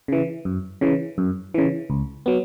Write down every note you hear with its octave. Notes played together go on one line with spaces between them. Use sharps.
C#3 E3
F#2
C#3 E3
F#2
C#3 E3
C#2
F#3 B3